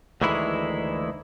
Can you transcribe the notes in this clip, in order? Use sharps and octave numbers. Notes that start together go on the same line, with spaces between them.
D2 D#3 E3 G#3 E4